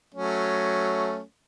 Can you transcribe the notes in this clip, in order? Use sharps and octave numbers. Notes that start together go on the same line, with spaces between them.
F#3 A3 C#4